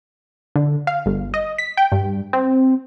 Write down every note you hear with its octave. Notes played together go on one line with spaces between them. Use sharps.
D3
F5
G1
D#5
B6
G5
G2
C4